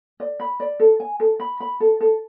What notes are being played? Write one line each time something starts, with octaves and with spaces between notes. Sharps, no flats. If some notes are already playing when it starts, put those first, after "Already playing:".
D5
B5
D5
A4
G#5
A4
B5
B5
A4
A4